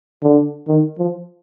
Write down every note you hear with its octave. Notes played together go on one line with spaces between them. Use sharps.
D3
D#3
F3